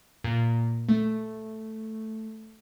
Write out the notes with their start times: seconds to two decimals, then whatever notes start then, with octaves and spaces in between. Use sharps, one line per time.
0.24 A#2
0.89 A3